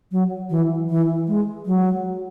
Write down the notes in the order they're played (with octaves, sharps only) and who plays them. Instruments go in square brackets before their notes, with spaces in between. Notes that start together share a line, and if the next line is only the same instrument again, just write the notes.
[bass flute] F#3
E3
E3
G#3
F#3